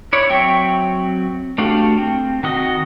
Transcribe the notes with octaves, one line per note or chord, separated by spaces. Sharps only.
E4 C#5 D5
F#3 C4 E5 G5 C#6
A3 D4 F#4 G4 F5
C4
D#3 F#4 D#5